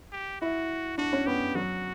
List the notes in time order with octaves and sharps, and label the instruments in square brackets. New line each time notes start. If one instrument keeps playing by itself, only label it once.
[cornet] G4
[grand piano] E4 [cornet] F#4
[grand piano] D4 [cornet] F#4
[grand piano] C#4
[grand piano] B3 [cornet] G4
[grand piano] F#3 [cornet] F#4